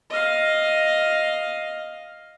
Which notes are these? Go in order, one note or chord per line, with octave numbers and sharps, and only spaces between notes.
D#5 F5